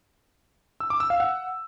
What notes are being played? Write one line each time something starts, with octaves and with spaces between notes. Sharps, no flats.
E6
D6
E6
F5
F#5